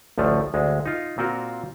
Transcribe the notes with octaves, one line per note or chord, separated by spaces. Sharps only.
A1 D2 F3 A3
D2 G#3
D#4 F4
A#2 C4 F4 F#4 A#4